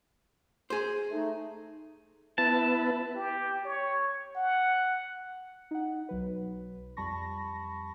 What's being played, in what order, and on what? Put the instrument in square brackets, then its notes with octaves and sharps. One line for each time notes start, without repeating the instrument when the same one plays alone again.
[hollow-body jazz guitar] G#4 C5
[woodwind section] A3 D#4
[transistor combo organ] B3 E4 B4 [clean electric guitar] A5
[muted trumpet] G4
C#5
F#5
[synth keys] D#4 F#5
B1 F#3 B4
F2 G3 A5 B5 C#6 A#6